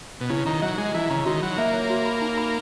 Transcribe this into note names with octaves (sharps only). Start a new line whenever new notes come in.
B2
C#3 E4
D#3 A#5
F#3 D#5
G#3 G#4
E3 E4
C#3 A#5
D#3 F#4
F#3 B5
A#3 E5
C#5
F#4
B5
D#4
B5